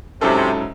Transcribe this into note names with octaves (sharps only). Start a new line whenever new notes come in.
G#2 C3 F#3 C#4 E4 A4